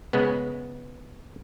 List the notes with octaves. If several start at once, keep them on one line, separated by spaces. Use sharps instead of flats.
C#3 G#3 B3